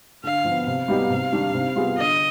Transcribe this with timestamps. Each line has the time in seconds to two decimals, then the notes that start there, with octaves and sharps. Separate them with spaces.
0.23 D3 F5
0.45 F3 B3
0.67 C3 F5
0.88 G3 B3 D#4 G4
1.10 C3
1.32 D#3 G3 D4 G4
1.54 C3
1.76 G3 B3 F4 G#4
1.97 D3 D#5